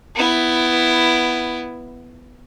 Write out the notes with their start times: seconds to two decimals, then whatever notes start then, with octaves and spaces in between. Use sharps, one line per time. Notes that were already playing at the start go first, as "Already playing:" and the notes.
0.15 B3 E4